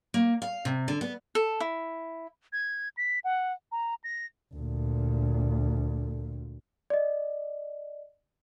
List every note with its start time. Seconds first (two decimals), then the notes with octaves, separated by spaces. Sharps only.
0.14 A#3
0.42 F5
0.65 C3
0.88 D3
1.01 B3
1.35 A4
1.60 E4
2.53 G#6
2.97 B6
3.24 F#5
3.72 A#5
4.04 A#6
4.54 D2 A#2
6.90 D5 D#5